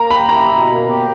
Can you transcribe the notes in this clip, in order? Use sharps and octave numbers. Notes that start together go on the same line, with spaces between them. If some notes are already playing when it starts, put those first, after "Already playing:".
Already playing: A#3 A#5
G4 B5
E4 A#5
B2
A#3
G4